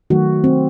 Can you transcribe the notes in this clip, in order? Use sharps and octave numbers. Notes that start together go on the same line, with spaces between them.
D#3 F#3 A3 F#4
C4